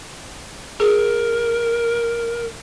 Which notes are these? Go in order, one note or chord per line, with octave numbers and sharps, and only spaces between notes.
G#4 A#4